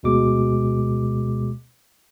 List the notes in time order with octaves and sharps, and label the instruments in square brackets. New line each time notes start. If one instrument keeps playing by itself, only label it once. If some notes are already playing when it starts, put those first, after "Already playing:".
[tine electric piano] D2 B2 G#3 D6